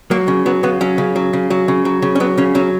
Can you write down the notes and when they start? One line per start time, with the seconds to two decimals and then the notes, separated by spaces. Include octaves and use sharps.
0.11 F#3 A#3
0.28 C#3
0.46 F#3 B3
0.63 C#3 B3
0.81 F#3 C#4
0.98 C#3
1.16 F#3
1.33 C#3
1.50 F#3
1.68 C#3
1.85 F#3
2.02 C#3
2.15 C#4
2.20 F#3 B3
2.38 C#3 C#4
2.55 F#3 C#4